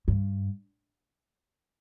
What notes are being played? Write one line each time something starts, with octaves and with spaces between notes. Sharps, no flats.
G2